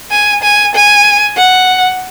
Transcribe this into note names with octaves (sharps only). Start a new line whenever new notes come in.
G#5
G#5
G#5
F#5